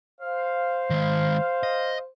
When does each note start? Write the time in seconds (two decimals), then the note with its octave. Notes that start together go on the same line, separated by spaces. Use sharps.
0.21 C5 F5
0.90 D#3 G#3
1.63 D#5